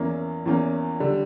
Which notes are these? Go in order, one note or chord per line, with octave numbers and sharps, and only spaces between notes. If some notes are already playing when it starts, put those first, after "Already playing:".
Already playing: E2 E3 A#3 C#4
E2 E3 A#3 C#4
D3 G3